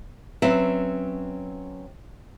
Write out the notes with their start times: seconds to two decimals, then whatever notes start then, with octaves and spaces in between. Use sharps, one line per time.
0.42 F#3 C4 C#4 B4 E5